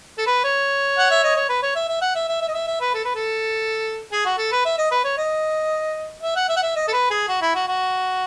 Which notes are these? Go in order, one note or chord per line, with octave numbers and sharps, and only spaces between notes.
A4
B4
C#5
F#5
E5
D#5
C#5
B4
C#5
E5
E5
F#5
E5
E5
E5
D#5
E5
E5
B4
A4
B4
A4
G#4
F#4
A4
B4
E5
D#5
B4
C#5
D#5
E5
F#5
E5
F#5
E5
D#5
A4
B4
G#4
F#4
E4
F#4
F#4